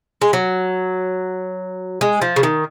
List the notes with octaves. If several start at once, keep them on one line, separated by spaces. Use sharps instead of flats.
G#3
F#3
G#3
F3
C#3
D#3